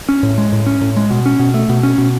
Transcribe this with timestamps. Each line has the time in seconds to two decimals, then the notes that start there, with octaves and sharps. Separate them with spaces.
0.09 C#4
0.23 A2
0.38 G#3
0.52 A2
0.66 C#4
0.81 A2
0.97 G#3
1.10 B2
1.26 C#4
1.39 B2
1.54 A3
1.69 B2
1.83 C#4
1.98 B2